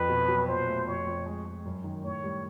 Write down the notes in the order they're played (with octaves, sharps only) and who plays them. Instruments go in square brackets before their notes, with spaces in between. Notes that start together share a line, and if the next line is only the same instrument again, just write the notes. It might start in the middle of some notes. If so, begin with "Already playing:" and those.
Already playing: [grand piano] F2 [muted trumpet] B4
[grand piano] B2
F#3
[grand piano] A#2 [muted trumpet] C5
[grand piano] A3
[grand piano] F2 [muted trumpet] C#5
[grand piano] F2
G#3
G#3
F#2
D#3
[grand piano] A2 [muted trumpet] C#5
[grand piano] G3